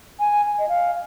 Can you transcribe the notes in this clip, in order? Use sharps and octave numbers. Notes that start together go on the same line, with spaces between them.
G#5
D#5
F5